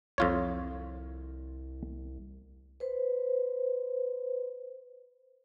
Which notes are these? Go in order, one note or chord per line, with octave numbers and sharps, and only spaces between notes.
C2 F2 F4 C#5
B4 C5